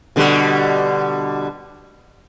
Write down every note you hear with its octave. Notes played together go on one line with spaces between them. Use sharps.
B2 D3 G3